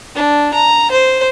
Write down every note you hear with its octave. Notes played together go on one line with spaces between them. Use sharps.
D4
A#5
C5